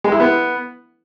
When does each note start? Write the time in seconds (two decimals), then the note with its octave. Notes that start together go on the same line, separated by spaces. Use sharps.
0.04 G#3
0.12 E4
0.20 B3